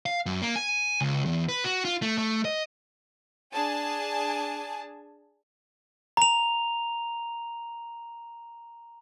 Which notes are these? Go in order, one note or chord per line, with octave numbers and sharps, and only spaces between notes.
F5
F#2
A#3
G#5
C#2
E2
B4
F#4
F4
A3
A3
D#5
D4 G#4 G#5 A5
A#5 F7